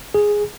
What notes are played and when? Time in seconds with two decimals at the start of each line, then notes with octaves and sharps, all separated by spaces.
0.14 G#4